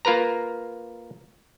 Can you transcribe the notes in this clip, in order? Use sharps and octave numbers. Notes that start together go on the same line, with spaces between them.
A#3 F4 A#4 B4 A#5